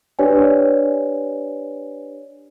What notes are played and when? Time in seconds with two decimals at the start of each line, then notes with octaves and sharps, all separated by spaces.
0.19 D4 G4 B4 C#5 D5 G#5